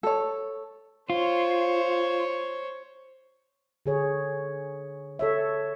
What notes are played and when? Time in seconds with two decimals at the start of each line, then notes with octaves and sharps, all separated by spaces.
0.03 A4 C#5
1.10 F4 C5 C#5
3.86 D3 G#4 C#5
5.19 A4 C#5 E5